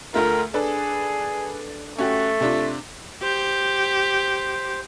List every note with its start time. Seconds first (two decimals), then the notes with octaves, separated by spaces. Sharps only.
0.14 D2 A3 F4 A#4
0.54 D4 G#4 A4 B4
1.99 A3 C#4 F#4 G4
2.41 C3 D4 F4
3.23 G4 C5